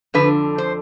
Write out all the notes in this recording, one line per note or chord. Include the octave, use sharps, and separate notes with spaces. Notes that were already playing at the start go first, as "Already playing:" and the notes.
F2 D3 F3 B4
C5